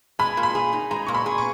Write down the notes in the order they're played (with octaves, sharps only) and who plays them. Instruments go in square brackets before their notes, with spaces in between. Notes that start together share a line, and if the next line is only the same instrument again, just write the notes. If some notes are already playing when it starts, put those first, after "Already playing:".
[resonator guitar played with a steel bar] G#3 [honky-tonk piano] B5
[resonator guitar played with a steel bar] A#2
[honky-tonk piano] B5
[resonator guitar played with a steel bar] G#4
D#4
[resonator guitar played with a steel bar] G#3 [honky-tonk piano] A#5
[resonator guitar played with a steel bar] A#2 [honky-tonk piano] C#6
[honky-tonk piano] B5
[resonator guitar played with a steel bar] G#4
[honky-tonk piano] C#6